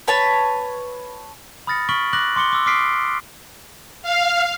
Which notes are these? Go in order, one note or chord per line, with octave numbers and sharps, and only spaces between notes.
B4 C#5 A5 B5
B5 D#6 F6 A6 A#6 C#7
C#6 F6 B6 D7 F#7
D6 F#6 A#6 F#7
C6 D6 C#7 G7
D6 E6
D6 D#6 F6 B6 C7 D7
F5